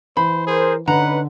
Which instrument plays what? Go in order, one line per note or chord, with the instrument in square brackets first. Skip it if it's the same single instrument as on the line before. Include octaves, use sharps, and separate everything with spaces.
[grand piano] E3 [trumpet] C5 [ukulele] B5
[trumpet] G#4 [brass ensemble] A#4 C5
[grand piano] D3 [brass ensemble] C#4 D#4 B4 [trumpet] F#5 [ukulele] A#5